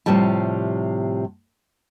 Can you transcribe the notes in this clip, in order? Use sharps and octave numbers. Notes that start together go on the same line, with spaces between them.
A2 C3 F3 G3 A5